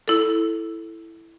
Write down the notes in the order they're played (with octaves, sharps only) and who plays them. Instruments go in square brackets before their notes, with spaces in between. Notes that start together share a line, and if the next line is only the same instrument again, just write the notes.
[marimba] E4 A4